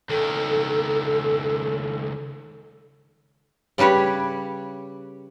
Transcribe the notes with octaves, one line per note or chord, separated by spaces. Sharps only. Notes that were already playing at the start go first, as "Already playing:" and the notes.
C#2 D#3 A4
C#3 G3 G4 B4 C#5